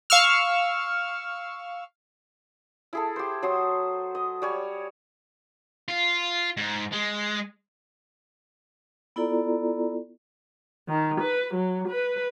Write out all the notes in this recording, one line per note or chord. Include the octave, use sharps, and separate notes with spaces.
F5 C#6 E6 F6
E4 G#4 A4
G4 C5
F#3 C5 C6 D#6
D#5
G3 C#5 G#5
F4
G#2
G#3
B3 E4 F4 A4 D5 A#5
D#3
B4
F#3
B4